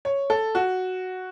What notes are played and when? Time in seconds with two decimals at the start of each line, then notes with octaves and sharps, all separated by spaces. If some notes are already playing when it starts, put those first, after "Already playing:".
0.05 C#5
0.30 A4
0.55 F#4